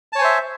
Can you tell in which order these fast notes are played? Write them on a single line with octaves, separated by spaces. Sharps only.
A5 C#5 G#5 C5 E5